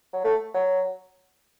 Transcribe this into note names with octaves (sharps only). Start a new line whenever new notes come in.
F#3
A3
F#3